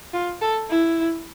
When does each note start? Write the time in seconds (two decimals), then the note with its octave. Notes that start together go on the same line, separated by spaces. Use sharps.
0.13 F4
0.42 A4
0.70 E4